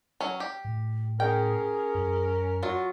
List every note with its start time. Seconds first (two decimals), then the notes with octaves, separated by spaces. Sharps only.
0.20 F#3 C#4
0.40 G4
0.65 A2
1.20 C#4 G#4 A#4 G5
1.95 F#2
2.63 F#3 F4 F#4